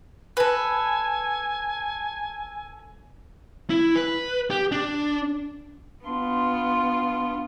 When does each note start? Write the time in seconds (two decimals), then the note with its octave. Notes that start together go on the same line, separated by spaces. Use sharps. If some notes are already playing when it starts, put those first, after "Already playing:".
0.37 A4 B4 G#5
3.70 E4
3.95 B4
4.50 G4
4.72 D4
6.05 B3 D4 F4 C6